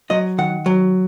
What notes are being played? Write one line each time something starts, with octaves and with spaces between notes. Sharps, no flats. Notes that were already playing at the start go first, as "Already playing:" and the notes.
F#3 D#5
D#3 F#5
F#3